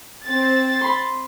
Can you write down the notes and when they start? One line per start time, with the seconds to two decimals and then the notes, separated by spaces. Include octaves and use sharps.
0.23 C4 A6
0.81 B5 C6